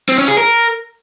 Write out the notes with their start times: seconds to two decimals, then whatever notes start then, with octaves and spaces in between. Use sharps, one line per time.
0.09 C4
0.18 C#4
0.28 G#4
0.38 A#4